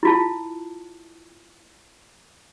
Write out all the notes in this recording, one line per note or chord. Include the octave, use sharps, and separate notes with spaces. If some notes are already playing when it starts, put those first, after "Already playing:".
E4 F4 A5